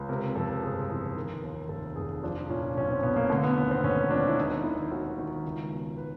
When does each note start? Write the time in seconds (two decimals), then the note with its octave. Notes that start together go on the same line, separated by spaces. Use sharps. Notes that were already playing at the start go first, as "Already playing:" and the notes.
Already playing: C#2
0.09 C3 A#4
0.35 F2 A4
0.63 G1 G#4
0.89 E3
1.17 D#3 A#4
1.43 D#2
1.69 F1 A4
1.96 F1 G#4
2.23 F3 D4
2.49 A#2 C#4
2.77 B1 C#4
2.91 C4
3.03 B1 B3
3.16 A#3
3.30 D3 A3
3.44 B3
3.57 D#2 B3
3.71 C4
3.83 E1 C#4
4.10 F3 D4
4.28 E4
4.38 D#2 D#4
4.64 D#3 E4
4.91 D#2 F#4
5.18 D#3
5.45 C#2
5.71 B2
5.98 B4